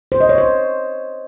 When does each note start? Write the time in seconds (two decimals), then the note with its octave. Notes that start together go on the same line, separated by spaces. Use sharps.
0.12 C5
0.21 D#5
0.29 C#5
0.38 C5